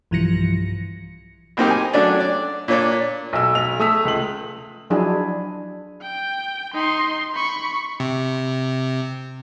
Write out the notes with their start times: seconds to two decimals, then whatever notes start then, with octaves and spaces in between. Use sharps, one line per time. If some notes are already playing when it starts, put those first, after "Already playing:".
0.11 B1 G2 E3 F3 A#6 C#7
1.57 B1 A#3 C4 D#4 G4
1.70 G#5
1.93 F#3 A3 C#4 D4 D5
2.20 D5
2.68 A#2 D4 C#5 D5
3.33 B1 E6
3.55 B1 F7
3.79 A3 D#6 E6 B6
4.05 C#2 F#7
4.90 F3 F#3 D4 E4 G#4
6.02 G5
6.73 D#4 C6
7.35 B5 C#6
8.00 C3